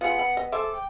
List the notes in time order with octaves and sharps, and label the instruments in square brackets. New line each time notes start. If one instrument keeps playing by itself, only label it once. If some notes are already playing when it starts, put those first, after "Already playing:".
[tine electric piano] B3 [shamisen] F4 G#4 [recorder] F#5
[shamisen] B5
D#5
[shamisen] G#4 C5 E5 [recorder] A4 [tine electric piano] D6
[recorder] G5